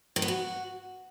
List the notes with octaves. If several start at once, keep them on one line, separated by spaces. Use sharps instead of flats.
D#3
B3
F#4